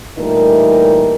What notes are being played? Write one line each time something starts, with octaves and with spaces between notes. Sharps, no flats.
A#2 E3 G3 A3 D#4 A#4